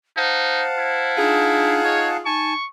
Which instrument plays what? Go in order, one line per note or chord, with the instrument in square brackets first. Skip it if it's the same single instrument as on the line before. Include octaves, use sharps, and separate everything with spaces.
[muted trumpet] D#4 [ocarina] C5 [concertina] F5 F#5 A5
[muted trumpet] E4
[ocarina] D4 [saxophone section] D#4 F4 G#4
[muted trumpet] C#5 [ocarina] D#5
[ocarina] D#4 [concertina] G#5 A5 [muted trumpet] C#6